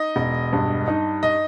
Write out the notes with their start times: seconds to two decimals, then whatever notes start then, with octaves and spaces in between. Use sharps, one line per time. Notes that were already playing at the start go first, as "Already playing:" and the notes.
Already playing: D#4 D#5
0.16 E1
0.53 G2
0.88 D#4
1.23 D#5